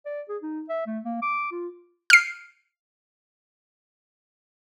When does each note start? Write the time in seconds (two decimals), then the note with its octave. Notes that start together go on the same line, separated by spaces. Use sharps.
0.05 D5
0.29 G#4
0.42 D#4
0.69 E5
0.87 A3
1.05 A#3
1.22 D6
1.52 F4
2.10 F6 C7